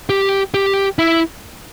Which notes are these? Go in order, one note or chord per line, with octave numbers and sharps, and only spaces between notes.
G4
G4
E4